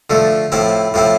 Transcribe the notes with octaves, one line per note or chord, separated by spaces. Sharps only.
D3 F3 A3
A2 F3 C4 E4
A2 F3 C4 E4